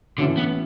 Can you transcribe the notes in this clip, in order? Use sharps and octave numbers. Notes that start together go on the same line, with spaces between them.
A2 D3 E3 A3 C#4 F#4
B3